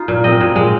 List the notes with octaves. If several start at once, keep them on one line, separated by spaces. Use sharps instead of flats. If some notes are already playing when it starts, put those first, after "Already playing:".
Already playing: D#4 F4
A#2
C4 D#5
A#2
G#3